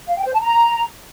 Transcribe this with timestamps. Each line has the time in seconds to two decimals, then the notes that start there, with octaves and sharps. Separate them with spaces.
0.08 F5
0.16 G5
0.25 C5
0.33 A5
0.41 A#5